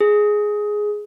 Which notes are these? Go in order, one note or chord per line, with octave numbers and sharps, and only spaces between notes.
G#4